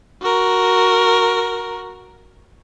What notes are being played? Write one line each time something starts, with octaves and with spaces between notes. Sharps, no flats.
F#4 A#4